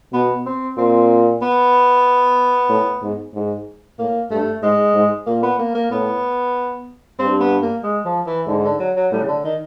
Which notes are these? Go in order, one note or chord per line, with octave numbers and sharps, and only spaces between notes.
B2 B3
C4
A#2 C4
B3
A2
G#2
G#2
A2 A#3
G2 A3
G#2 G#3
G#2
A#2 A#3
B3
A#3
A#3
A2 B3
G2 C4
B3
A#3
G#3
F3
E3
G#2 D3
D3
F#3
F#3
A2 G3
C#3
D3
D#3